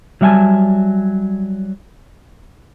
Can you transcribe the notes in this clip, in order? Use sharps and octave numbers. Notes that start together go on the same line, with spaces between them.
F#3 G3 E5 F#5 G#5 A5